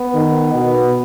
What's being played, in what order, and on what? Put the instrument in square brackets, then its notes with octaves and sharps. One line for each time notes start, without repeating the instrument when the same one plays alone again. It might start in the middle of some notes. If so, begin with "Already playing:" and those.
Already playing: [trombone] B3
[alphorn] D#3
B2